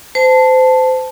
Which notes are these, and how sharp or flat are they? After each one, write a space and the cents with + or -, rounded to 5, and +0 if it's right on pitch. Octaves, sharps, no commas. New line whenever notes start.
C5 -30 A5 +0